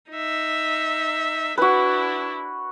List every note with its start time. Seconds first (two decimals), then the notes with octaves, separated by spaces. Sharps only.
0.11 D#4 E5
1.58 D4 E4 F#4 B4